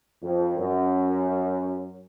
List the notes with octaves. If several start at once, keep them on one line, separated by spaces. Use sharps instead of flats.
F2
F#2